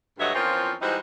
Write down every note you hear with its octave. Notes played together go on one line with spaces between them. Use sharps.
D2 G2 F#3 C#5 D#5 E5
E2 F3 C4 C#4 F4 A#4
E3 G3 G#3 D#4 F#4 C5